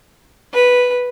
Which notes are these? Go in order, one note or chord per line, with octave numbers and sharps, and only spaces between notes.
B4